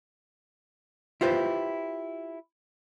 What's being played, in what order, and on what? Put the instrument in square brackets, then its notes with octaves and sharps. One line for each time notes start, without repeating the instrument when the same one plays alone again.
[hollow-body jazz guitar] E4 F4 G4 B4 C5